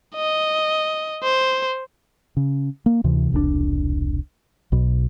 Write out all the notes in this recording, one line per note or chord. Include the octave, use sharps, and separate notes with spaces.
D#5
C5
C#3
A#3
D2 C3 E3
E1 C2 A#2 D4
B1 B2